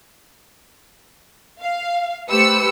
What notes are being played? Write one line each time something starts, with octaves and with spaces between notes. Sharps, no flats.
F5
A3 G4 B4 C5 E6 C#7